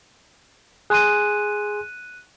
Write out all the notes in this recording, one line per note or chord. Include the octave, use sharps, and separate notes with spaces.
G#4 G#5 C6 F#6 D#7